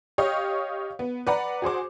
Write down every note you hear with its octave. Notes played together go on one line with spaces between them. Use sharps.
G4 C#5 D#5 F5 C#6
B3
B4 D5 F#5 A#5
F#4 G#4 C5 D6